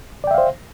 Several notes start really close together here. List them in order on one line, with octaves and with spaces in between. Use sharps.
D5 G5 E5 F5 C5